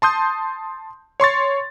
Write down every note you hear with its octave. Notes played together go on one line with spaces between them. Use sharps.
A5 C6 D#6 G6
C#5 C6 C#6 A6